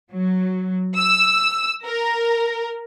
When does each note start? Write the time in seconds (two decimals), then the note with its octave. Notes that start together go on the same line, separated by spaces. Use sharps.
0.12 F#3
0.97 E6
1.85 A#4